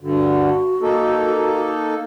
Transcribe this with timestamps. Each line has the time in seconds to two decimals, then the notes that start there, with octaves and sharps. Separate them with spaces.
0.01 G2 D3 F#4
0.82 A#3 D#4 A4